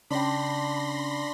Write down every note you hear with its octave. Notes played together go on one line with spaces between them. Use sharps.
C#3 C#4 D4 G5 B5 C6 A#6